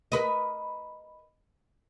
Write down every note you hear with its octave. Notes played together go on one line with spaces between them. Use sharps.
A#4 B4 D#5